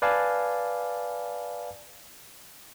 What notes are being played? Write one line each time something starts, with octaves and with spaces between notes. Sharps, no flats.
B4 D5 F5 G#5 A5